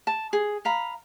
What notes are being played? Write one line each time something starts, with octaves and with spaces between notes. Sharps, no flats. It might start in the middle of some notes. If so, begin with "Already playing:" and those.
A5
G#4
F5 A#5 B5